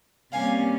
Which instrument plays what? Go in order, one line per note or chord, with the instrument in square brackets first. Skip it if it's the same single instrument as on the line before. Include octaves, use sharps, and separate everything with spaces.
[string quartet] C3 G3 A#3 C#4 F5 G#5